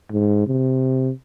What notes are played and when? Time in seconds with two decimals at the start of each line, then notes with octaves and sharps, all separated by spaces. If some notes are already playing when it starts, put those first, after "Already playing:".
0.11 G#2
0.47 C3